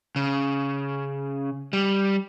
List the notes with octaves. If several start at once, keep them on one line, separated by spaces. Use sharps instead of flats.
C#3
G3